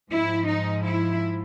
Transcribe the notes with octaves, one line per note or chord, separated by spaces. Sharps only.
G#2 F3 E4
D#4
E4